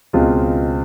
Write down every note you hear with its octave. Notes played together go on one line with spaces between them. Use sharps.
C#2 B2 G#3 C4 F4